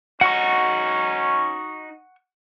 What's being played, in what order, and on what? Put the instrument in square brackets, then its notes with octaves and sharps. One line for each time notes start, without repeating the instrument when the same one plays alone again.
[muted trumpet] C#4 [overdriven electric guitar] D#4 F#4 [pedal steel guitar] F#5 C#6